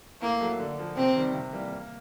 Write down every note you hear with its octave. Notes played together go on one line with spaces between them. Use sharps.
A2 A#3
F#3 A3
D3
F3 A#3
C3 C4
D#3 G3
C3
E3 G3 A#3
A#3